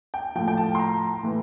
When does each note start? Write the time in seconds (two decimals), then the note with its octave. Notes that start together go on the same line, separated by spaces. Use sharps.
0.14 G5
0.35 A2 F3 G5
0.48 G5
0.57 A5
0.75 C6
0.79 A#5
1.23 A2 E3